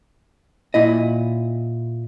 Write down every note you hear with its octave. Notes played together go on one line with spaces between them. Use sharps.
A#2 E4 D#5